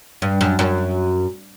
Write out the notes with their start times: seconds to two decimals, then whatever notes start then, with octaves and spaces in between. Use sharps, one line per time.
0.22 G2
0.41 F#2
0.59 F#2